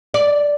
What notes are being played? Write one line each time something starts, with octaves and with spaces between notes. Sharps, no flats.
D5